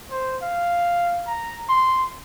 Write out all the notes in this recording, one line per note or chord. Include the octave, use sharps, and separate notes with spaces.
C5
F5
A#5
C6